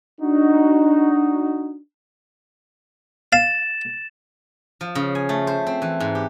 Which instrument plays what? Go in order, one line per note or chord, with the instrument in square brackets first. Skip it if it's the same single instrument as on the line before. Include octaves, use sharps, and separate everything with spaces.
[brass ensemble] D4 D#4 F#4
[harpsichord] F5 [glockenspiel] A6 E7
[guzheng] F3
C#3
G#5
A3
C5
C4
E3
G#2
G4